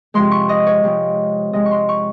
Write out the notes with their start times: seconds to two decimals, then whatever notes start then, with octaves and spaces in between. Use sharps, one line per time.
0.14 C3 F3 G#3 C6
0.31 C#6
0.49 D#5
0.67 C#5
0.83 C3 F3 G#3
1.53 C3 F3 G#3 D#5
1.66 C#6
1.71 C6
1.89 C#6